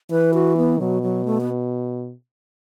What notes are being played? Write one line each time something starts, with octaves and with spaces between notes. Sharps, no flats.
E3 B4
F#4
B3
B2 F#3
F#3
A3
B3